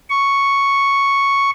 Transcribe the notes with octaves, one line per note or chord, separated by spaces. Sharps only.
C#6